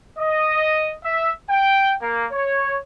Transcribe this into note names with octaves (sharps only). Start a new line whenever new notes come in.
D#5
E5
G5
A#3
C#5